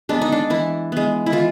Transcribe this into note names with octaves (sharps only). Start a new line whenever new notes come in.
G#3 B3 D4
D#4
D4
E3 E4
G#3 B3
E4
E3 F4